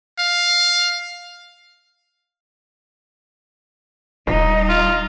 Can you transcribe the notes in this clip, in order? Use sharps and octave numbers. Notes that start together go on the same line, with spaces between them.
F5
D#1 G3 D#4
F4